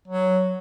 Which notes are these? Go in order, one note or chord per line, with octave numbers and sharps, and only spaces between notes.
F#3